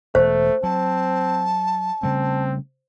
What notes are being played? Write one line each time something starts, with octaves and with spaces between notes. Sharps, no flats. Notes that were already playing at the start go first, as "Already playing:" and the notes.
E1 A3 C5
F#3 C4 A5
C#3 G3 A3 C4